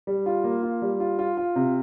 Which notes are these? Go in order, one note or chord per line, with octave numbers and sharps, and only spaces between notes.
G3
F4
A#3
F4
G3
F4
F4
F4
C3